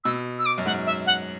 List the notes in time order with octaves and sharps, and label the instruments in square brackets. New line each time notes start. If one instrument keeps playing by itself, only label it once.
[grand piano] B2 [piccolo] E6
[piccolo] E6
D6
[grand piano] F#2
[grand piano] G#2 [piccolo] F#5
[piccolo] E5
F#5